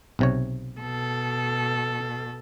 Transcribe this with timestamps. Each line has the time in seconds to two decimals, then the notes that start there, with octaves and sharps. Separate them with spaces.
0.19 B1 C3 C#5
0.80 B2 A4